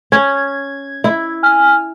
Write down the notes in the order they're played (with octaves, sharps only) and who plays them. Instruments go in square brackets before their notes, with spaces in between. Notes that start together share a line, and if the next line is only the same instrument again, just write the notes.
[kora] C#4 [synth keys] G#6
[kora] E4
[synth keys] G#5 F6